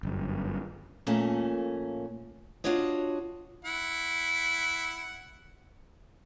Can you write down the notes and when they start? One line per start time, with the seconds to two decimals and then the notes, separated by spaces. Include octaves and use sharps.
0.03 G1 F#2
1.07 F2 A#2 A3 A#3 C#4 A5
2.64 D4 F4 F#4 C#5 D#5
3.65 E4 F#5